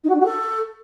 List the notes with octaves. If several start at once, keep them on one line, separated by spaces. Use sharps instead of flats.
D#4
F#4
D4
F#4
A4